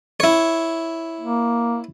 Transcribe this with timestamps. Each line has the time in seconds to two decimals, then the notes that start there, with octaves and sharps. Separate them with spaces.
0.20 E4 C#5
1.20 A#3